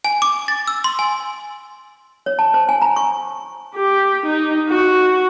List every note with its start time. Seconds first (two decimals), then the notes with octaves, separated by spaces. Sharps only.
0.04 G#5
0.22 D6
0.48 A6
0.68 E6
0.84 C6
0.99 G#5
2.26 C#5
2.39 A5
2.54 C5
2.69 G#5
2.82 A#5
2.96 C#6
3.75 G4
4.26 D#4
4.69 F#4